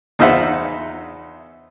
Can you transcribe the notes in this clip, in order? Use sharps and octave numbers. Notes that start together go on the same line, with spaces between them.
E2 D#4 F4 C5 E5 F#5